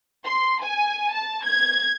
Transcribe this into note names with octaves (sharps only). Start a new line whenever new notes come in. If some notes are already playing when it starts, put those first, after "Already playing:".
C6
G#5
A5
G#6